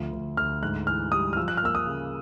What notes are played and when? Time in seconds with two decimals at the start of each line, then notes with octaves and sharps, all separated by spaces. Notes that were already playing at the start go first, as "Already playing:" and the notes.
Already playing: D2 F3
0.13 D2
0.37 D2 F6
0.63 G#2 F#6
0.87 E3 F6
1.12 G3 D#6
1.33 F6
1.37 F3 E6
1.48 F#6
1.57 F6
1.62 A#3 E6
1.75 D#6
1.86 C#3